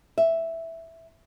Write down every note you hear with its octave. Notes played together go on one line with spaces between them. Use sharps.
E5